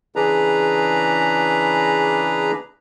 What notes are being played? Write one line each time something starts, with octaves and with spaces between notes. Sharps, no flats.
C#3 E3 D4 G#4 B4 A#5